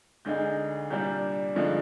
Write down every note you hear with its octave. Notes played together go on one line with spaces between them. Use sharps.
D2 D3 G#3 D#4 G6
C2 A#2 G3 D4 G6
G2 D3 F3 G#3 D#4